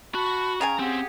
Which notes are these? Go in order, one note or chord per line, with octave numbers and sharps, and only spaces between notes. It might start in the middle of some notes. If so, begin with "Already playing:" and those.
F#4 A5 B5 C#6
C#3 F5 G5 G#5 A#5 C#6
C4 G4 G#4 F#5